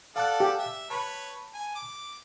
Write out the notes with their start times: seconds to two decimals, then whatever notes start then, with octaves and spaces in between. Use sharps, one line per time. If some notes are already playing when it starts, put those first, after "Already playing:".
0.16 A4 D5 F5 F#5 A5 F#6
0.40 G4
0.59 E5
0.90 B4 C#5 A5 B5
1.54 G#5
1.75 D6